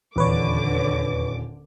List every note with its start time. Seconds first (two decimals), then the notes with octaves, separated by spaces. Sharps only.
0.16 D#1 E2 D3 B4 C#5 D6